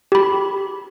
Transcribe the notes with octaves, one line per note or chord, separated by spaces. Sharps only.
G4 B5